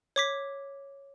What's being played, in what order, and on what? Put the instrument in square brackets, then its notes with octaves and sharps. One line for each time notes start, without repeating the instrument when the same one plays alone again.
[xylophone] C#5 D6 B6